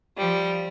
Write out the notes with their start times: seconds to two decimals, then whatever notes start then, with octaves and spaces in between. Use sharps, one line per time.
0.18 F3 G3